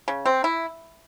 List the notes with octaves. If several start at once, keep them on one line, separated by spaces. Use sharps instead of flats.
C#3
C4
E4